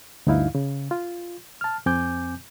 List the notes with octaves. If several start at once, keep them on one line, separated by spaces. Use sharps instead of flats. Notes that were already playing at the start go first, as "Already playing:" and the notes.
D2 G2 D#4 E4 F5
C#3
F4
A5 F6
F2 C4 G#5 D6 G6